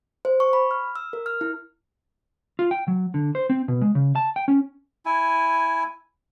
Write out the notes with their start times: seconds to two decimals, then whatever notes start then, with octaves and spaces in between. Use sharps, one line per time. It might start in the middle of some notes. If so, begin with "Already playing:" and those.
0.25 C5
0.40 C#6
0.53 B5
0.71 F6
0.96 E6
1.13 A#4
1.26 F6
1.41 E4
2.59 F4
2.71 G5
2.88 F#3
3.14 D3
3.35 C5
3.50 C4
3.68 B2
3.81 G#3
3.95 C#3
4.16 A5
4.36 G5
4.48 C#4
5.06 E4 G#5